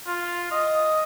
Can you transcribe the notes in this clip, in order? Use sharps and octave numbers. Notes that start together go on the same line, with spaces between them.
F4
D#5